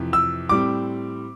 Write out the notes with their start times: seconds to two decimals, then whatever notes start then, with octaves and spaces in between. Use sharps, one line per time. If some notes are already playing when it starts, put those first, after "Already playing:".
Already playing: F2 C3 E3
0.13 E6
0.49 A2 G3 C4 D6